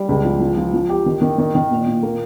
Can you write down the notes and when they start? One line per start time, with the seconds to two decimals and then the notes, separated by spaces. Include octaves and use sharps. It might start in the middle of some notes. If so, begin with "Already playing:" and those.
Already playing: G3
0.09 C#2
0.25 F3
0.40 F3
0.57 F3
0.73 F3
0.89 G4
1.06 D#3
1.22 D#3
1.38 D#3
1.55 D#3
1.71 A#2
1.86 A#2
2.03 A#3